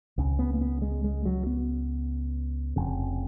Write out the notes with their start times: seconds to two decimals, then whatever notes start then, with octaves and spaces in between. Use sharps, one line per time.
0.18 C#2 C#3
0.39 B3
0.54 A#3
0.61 B3
0.82 G#3
1.04 G#3
1.25 F#3
1.46 B3
2.76 F1 F2 C#3